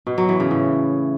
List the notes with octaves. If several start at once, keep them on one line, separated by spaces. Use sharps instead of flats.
B2
F#3
E3
C#3
A2